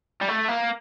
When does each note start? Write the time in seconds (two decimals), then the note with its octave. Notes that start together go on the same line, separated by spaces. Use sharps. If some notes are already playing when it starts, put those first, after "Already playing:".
0.21 G3
0.28 A3
0.48 A#3